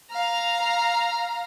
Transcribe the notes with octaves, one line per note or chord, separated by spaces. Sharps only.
F5 A#5